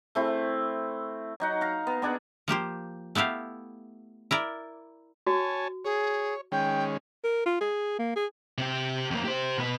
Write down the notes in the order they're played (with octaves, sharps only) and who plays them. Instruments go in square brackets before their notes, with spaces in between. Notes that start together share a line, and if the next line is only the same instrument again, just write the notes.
[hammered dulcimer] A3 C4 E4
F#3 D#4 F#5
F5 A#5
B3
B3 D4 G#4 F#5
[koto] F3 A#3 G4 C5
A3 B3 E4 G4 F5
E4 A#4 D5
[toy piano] F#4 [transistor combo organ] C#5 G#5 A5
[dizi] G#4 [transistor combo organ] C#5
[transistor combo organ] D#3 G#3 C#4 [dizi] G5
[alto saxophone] A#4
F4
G#4
A#3
G#4
[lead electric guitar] C3 G4
F2 A#3
G4 C5
B2 B4